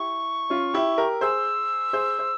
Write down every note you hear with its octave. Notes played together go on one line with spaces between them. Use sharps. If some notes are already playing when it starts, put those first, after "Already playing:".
Already playing: E4 G4 C#6
C#4 F4
E4 G4
G4 A#4
G#4 C5 E6
G#4 C5
C5